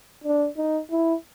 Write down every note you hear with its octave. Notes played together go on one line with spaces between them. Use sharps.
D4
D#4
E4